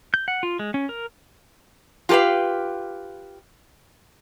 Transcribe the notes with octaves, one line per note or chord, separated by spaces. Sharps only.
G6
F#5
F4
G#3
C#4
A#4
F4 G4 A4 B4 F5